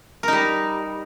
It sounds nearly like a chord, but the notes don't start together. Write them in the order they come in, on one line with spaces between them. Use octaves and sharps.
A#4 D#4 G3